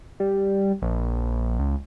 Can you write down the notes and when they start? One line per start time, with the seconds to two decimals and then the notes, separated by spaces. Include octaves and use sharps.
0.20 G3
0.82 A#1
1.59 C#2